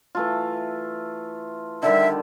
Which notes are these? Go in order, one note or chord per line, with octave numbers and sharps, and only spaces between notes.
E3 A3 F4
D3 D#3 G3 E5